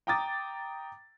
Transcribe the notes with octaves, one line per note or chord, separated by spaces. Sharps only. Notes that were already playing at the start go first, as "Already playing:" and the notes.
G5 A#5 D6 D#6 A6